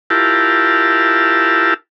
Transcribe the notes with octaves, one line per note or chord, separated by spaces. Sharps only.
E4 F4 G4 A#4 A5